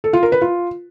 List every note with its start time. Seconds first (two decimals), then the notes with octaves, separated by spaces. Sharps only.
0.04 A4
0.13 F4
0.23 A#4
0.32 B4
0.42 F4